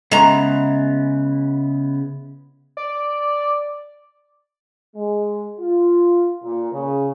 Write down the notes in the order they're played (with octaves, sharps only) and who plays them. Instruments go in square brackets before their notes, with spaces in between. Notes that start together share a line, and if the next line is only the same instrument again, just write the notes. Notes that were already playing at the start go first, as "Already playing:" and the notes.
[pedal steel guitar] C#3 B3 E4 [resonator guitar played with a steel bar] G#3 A#5
[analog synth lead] D5
[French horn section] G#3
F4
A#2
C#3